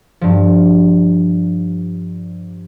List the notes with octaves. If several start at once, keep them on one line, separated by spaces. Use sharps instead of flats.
G2 F3